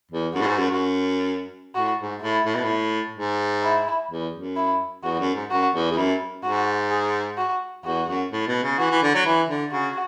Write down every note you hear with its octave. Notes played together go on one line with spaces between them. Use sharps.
E2
F#2 F#4
A2
G#2
F#2
F#2
A2 F#4
G#2
A2 E4
A2
B2
A2
G#2
E4
E2
F#2
E4
E2 F#4
F#2
G#2
F#2 F#4
E2
E2
F#2 E4
G#2 F#4
G#4
F#4
E2 F#4
F#2
A2
B2
C#3
E3 F#4
E3
D3
F#3
E3 E4
D3
C#3 F#4